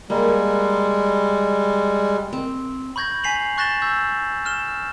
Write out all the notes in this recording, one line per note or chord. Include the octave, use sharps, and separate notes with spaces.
G3 G#3 A#3
C4
B5 C#6 G6 G#6 A#6
G#5 B6 C7 F7 F#7
C#6 F#6 A6 A#6 E7 G7
C#6 E6 G6
F6 E7 G7